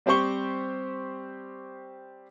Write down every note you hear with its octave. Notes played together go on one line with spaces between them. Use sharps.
G3 C4 G4 C5 C#6 G7